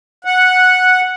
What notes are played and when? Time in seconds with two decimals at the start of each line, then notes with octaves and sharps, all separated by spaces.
0.25 F#5